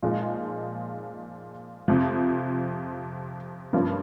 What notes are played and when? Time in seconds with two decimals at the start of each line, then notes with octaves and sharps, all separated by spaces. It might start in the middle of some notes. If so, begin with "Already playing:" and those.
0.02 A#2 F3 G#3 D#4
1.88 F2 C3 F3
3.73 G2 F3 A#3 C#4 F4